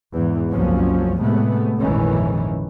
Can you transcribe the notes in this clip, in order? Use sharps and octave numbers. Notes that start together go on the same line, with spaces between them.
E2 G#2 E3
F#1 C2 F3 F#3 C#4
A2 C3 G#3 A3 B3
A#1 F2 G#2 D#3 E3 C#4